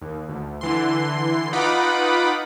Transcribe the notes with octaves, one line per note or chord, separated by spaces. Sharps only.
D#2
D2
D3 E3 C6
D#4 F4 B4 F#5 B5 D6